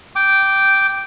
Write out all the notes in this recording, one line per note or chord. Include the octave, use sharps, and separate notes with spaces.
G5 D6